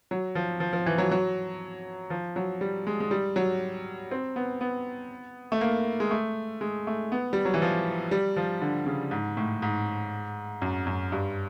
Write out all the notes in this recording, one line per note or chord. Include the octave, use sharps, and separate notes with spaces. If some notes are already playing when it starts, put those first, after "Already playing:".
F#3
F3
F3
F3
E3
F#3
F#3
F3
F#3
G3
G#3
G#3
G3
F#3
C4
B3
B3
A3
A#3
G#3
A3
G#3
A3
B3
G3
F#3
E3
F3
G3
F3
D3
C#3
G#2
A2
G#2
F#2
F#2
G2